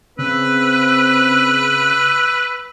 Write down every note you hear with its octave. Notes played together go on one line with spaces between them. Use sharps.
C#3 C4 B4 E6